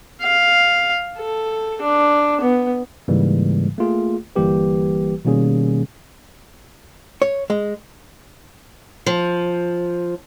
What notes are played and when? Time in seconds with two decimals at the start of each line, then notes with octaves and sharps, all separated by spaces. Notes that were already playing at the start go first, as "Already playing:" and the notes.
0.22 F5
1.19 A4
1.82 D4
2.41 B3
3.08 G#2 C#3 E3 G3 G#3 A#3
3.78 A3 A#3 F4 G#4
4.36 G1 E3 G3 A#3 G4 B4
5.25 B2 D#3 G3 A#3 C#4 G#4
7.22 C#5
7.50 G#3
9.06 F3